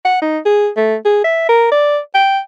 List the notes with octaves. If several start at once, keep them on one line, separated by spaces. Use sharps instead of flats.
F#5
D#4
G#4
A3
G#4
E5
A#4
D5
G5